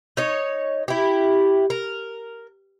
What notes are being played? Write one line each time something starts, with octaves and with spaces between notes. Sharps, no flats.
D#4 C#5
E4 G4
A#4